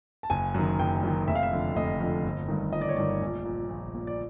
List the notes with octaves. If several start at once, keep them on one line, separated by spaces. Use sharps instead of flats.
A5
F#1 G#5
F#2 D#3
F#1 G5
F#2 D#3
F1 E5
F5
E5
F2 D3
F1 D#5
F2 D3
G1
G2 D#3
G1 D#5
D5
C#5
G2 D#3 D5
A#1
A#2
A#1
A#2
D5